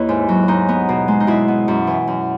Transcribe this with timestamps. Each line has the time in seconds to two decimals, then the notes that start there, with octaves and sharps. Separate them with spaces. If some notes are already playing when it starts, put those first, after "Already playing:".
Already playing: D#2 E4 B4 C#5
0.09 G#2
0.29 F#3
0.48 G#2 D#4
0.69 B3
0.89 B2
1.08 G#3
1.20 D#4
1.27 B2 E4
1.48 B3
1.68 F#2
1.87 E3
2.07 F#2